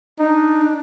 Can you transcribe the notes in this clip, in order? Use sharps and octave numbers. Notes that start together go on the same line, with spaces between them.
D4 D#4